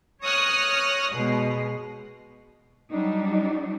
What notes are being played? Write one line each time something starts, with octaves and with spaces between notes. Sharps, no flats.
C#5 C#6 D#6 F6 F#6 A#6
B2 G#3
F#3 G3 D4 D#4